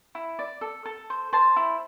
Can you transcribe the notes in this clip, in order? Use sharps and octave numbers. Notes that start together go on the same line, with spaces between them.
E4
D5
A4
A4
C5
C5 A5 C6
E4